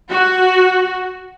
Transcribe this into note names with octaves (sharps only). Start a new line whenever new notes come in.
F#4